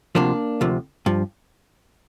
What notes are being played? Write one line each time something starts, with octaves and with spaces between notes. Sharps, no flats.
D2 C3 F3 A#3 D4
D2 C3 F3
G2 F3